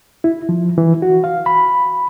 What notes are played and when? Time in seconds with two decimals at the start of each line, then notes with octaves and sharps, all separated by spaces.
0.24 E4
0.49 F3
0.78 E3
1.02 F#4
1.24 F5
1.46 B5